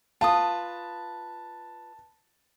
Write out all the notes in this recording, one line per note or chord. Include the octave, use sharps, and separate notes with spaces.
F4 B4 A5 D#6